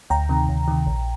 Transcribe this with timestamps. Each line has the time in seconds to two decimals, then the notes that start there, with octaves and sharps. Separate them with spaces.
0.10 D2 G5 A#5
0.29 C3 D#3
0.49 D2
0.68 C3 D#3
0.87 A#1